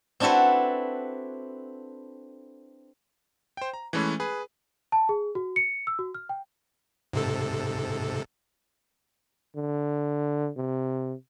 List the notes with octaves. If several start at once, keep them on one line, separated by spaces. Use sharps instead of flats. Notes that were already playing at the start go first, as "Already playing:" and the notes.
C4 D4 E4 F#4 A4 B4
C5 G5
A#5
E3 G#3 A3 C#4 B4 C#5
G#4 B4
A5
G#4
F#4
C#7
E6
F#4
F6
G5
G#2 C3 A4
D3
C3